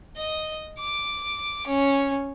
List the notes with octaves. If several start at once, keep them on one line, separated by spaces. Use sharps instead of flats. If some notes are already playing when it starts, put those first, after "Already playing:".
D#5
D6
C#4